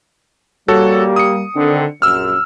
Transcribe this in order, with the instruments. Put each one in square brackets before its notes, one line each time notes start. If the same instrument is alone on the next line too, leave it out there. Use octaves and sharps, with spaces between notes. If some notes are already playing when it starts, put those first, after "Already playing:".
[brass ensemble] G3 A#3 [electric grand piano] F#4 A4 C#5
[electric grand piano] D#6 C#7
[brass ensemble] D3 D#3 C4
[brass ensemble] A#1 F#2 [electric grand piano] E6 F6